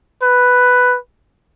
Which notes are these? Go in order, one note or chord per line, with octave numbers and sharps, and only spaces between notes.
B4